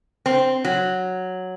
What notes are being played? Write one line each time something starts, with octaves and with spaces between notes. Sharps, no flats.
C4
F#3